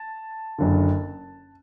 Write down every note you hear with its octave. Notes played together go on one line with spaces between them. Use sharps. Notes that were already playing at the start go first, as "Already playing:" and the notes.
Already playing: A5
F#1 F#2 D3